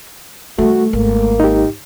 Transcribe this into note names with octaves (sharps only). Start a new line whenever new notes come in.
D#3 G3 A3 F#4
G#1 A#3
D#4 G4